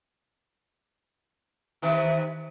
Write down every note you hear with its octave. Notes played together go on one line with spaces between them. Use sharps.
C3 D#3 B4